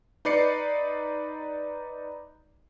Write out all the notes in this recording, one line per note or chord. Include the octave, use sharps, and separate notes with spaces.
D#4 B4 D5 C7 C#7